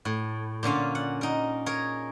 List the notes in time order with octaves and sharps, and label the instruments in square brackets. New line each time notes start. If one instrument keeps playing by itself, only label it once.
[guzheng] A2
A#2 D3 C#4 F4
F#5
D#4 A#4
G#4 A#4 C#5